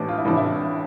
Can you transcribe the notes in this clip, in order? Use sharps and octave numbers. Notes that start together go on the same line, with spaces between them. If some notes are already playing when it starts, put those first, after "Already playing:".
Already playing: A1 A2 E3 D4
F4
E4
A1 A2 E3 D4
E4